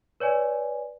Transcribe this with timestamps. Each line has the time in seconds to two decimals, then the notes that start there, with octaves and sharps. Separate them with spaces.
0.20 B4 C#5 D5 G#5